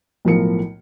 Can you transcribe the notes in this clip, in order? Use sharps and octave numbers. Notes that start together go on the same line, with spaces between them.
B1 A2 F3 A#4 C#7